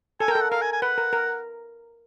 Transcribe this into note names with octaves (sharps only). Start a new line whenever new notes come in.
A4 G#5
A#4
A4 G5
F#5
A#4 F5
G#5
G#5
B4 F#5
A#4
A#4